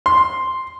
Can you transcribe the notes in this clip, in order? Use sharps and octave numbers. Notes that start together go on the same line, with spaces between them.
C6